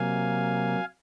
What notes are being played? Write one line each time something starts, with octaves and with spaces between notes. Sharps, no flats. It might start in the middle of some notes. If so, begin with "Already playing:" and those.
Already playing: C3 F#3 A#3 F5 G#5